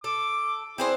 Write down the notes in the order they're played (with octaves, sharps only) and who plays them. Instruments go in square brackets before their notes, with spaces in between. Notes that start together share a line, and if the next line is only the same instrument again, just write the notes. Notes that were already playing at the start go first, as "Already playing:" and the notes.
[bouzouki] A4 [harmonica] D6
[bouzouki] C4 D4 C5 [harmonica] E4 G#4